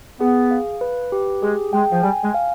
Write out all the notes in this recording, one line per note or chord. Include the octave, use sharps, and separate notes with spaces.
B3 G#4
F5
B4
G4
G#3 G#4
G#3 G5
F3
G3 G#5
G#3
F5